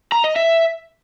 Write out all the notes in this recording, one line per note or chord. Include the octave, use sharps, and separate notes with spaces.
A#5
D#5
E5